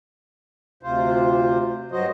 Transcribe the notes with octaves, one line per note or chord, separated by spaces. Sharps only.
D2 C3 F4 C5
G2 F#3 F#4 C5 D#5